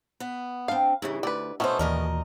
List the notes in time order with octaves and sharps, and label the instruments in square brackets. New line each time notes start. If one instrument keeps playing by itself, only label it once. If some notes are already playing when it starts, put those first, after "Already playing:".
[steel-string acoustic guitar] B3
[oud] C4 D4 [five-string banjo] F5
[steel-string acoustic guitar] G2 C#3 E3 [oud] D#4 E4
[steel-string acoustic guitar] D2 [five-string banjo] B4 D5
[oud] B2 [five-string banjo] A3 B3 C#4 [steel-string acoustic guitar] D#4 A4 C5
[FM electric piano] D#2 E3 D5 [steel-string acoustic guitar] A#2 A#4 D#5